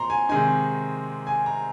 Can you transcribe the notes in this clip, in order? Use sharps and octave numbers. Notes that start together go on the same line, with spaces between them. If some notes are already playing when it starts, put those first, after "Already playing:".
Already playing: A#2 C4 A#5 C6
G#5
C3 D#3 G#3 D#4 G#5
G#5
A#5